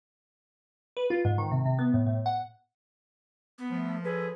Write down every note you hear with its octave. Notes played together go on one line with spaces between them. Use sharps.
B4
F4
G#2
D#3
C3
C3
B3
A2
A2
F#5
B3
F3 A3
G#4 A4 B4